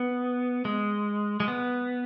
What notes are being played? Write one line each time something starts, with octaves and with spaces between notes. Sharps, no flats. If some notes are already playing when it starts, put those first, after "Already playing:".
Already playing: B3
G#3
G#3
B3